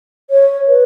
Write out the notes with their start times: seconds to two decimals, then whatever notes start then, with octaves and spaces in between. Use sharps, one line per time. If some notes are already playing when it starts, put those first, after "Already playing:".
0.30 C#5
0.68 B4